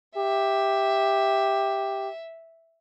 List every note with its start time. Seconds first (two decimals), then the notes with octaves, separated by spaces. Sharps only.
0.17 G4 E5